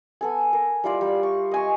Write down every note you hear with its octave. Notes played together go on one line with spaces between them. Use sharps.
B3 A4 G#5
A#4
G3 E4 F4 D5
G3
C#6
D#5 G#5 C#6